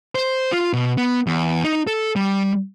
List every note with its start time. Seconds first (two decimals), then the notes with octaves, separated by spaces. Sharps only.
0.15 C5
0.52 F4
0.73 B2
0.97 B3
1.27 E2
1.64 D#4
1.87 A4
2.16 G3